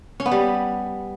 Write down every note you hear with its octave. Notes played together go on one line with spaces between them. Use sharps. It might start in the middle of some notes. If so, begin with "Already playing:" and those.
C#4
B3
G3